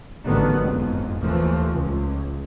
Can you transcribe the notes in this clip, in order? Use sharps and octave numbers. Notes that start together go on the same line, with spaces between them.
A1 D3 D#3 F#3 B3
F#1 F2 G#2
D#2 E3 F3 A3
C#2